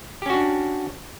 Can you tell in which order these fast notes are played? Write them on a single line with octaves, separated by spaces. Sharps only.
G4 C#4 F#4 D4